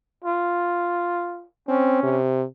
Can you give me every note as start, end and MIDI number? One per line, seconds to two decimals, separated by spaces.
0.24 1.45 65
1.68 2.02 60
1.68 2.19 61
2.03 2.44 48